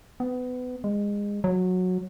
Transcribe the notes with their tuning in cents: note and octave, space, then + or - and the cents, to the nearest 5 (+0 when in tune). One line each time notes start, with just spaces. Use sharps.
B3 +25
G#3 -25
F#3 -15